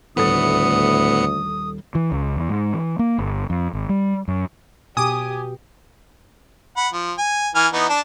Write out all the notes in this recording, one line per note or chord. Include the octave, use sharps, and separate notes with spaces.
D#1 D2 A2 B3 A4 D#6 A6 C#7
E3
C#2
E2
G#2
E3
A#3
G1
F2
G#1
G3
F#2
B2 G4 G#5 D6 D#6
F#5 B5
F3
G#5
E3 G#5 F6
E3 B3 D#4
D4 A5